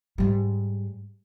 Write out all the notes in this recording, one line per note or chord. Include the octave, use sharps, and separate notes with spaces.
G#2 G3